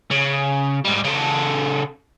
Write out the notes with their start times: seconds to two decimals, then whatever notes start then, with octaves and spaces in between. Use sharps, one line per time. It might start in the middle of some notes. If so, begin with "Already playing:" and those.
0.11 C#3
0.85 G#2 G3
1.04 C#3 A4